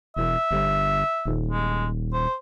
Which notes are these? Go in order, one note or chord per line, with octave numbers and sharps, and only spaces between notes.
E1 E5
G1
D#1
G#3
C5